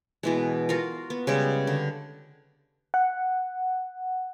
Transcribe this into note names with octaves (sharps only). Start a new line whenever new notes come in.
B2 E3 G#3
F4 F#4 A#4
B3
C#3 G3 G#3
D3
F#5